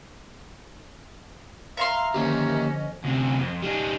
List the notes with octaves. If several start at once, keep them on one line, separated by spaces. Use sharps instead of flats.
E5 F5 A#5 C6
D3 D#3 F3 A#3 C#4 G4 D#5
D2 C3
F2
G3 D#4